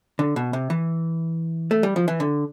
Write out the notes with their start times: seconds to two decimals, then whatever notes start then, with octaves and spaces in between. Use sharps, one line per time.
0.19 D3
0.36 B2
0.53 C3
0.70 E3
1.71 A3
1.83 G3
1.96 F3
2.08 E3
2.20 D3